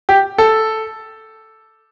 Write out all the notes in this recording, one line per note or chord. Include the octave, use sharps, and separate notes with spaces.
G4
A4